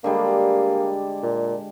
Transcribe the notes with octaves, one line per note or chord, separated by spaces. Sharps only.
D3 G3 G#3 A#3
A#2